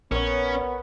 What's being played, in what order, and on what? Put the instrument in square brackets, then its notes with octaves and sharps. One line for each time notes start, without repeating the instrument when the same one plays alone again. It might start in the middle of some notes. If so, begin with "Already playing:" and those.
[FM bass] A#1 [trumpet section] B3 [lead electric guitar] C#4 [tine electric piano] A#4 C#5